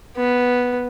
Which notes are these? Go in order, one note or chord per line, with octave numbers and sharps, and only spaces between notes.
B3